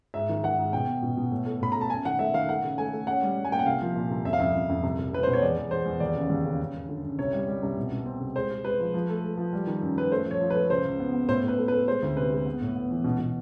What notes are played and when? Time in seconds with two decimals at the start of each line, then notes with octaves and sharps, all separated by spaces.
0.14 G#2 E5
0.29 D#3
0.43 D#3 F#5
0.58 G#2
0.73 B2 G5
0.87 B3
1.03 B2
1.17 B2
1.31 A2
1.46 A3
1.61 A2 B5
1.72 A3 A#5
1.81 A5
1.90 F#2 G#5
2.05 D#3 F#5
2.19 A3 E5
2.34 D#3 F5
2.49 A3 F#5
2.64 C#3
2.78 A3 G#5
2.93 A3
3.07 C#4 F#5
3.22 G3
3.37 G3
3.45 G#5
3.52 A#3 G5
3.59 F#5
3.66 C2 F5
3.82 F3
3.96 A#2
4.11 C2
4.25 F2 E5
4.33 F5
4.40 F2 E5
4.54 F2
4.69 F2
4.83 C2
4.99 C2
5.13 C2 B4
5.23 B2 C5
5.33 C#5
5.42 E2 D5
5.57 E2
5.71 E2 C5
5.86 E2
6.00 D#2 D5
6.15 C#3
6.30 D#2
6.45 C#3
6.60 F#2
6.74 F#2
6.89 D3
7.03 F#2
7.19 C2 C#5
7.33 G3
7.48 G3
7.63 C2
7.77 B2
7.92 B2
8.06 C4
8.21 C2
8.36 G#3 C5
8.51 G#3
8.65 G#3 B4
8.80 F3
8.94 F3
9.09 A3
9.24 A3
9.37 F3
9.53 G3
9.67 D#3
9.81 F#2
9.97 F#2 B4
10.11 A3 C5
10.26 F3
10.31 C#5
10.41 F3
10.50 B4
10.55 A3
10.70 C#2 C5
10.85 C#2
11.00 B3
11.14 B3
11.28 A2 C5
11.43 A2
11.48 B4
11.58 A3
11.68 B4
11.72 A3
11.88 G#3 C5
12.03 D2
12.17 C3 B4
12.31 G#3
12.46 B3
12.61 A2
12.76 B3
12.91 E3
13.04 B2
13.19 B2